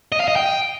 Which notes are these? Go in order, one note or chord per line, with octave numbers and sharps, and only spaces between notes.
D#5
F5
D#5
G5